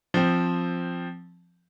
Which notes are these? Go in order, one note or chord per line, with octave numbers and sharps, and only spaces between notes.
F3 C4